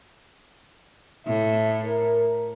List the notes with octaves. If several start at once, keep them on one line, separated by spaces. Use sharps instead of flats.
A2 E5
A#4